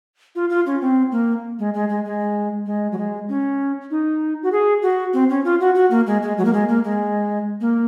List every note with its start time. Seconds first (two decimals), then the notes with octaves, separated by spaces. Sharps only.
0.35 F4
0.50 F4
0.66 C#4
0.81 C4
1.11 A#3
1.59 G#3
1.74 G#3
1.89 G#3
2.05 G#3
2.66 G#3
2.92 F#3
2.98 G#3
3.29 C#4
3.91 D#4
4.43 F#4
4.52 G#4
4.82 F#4
5.14 C4
5.30 C#4
5.45 F4
5.60 F#4
5.75 F#4
5.91 A#3
6.07 G#3
6.23 G#3
6.38 F#3
6.45 A#3
6.53 G#3
6.69 A#3
6.84 G#3
7.61 A#3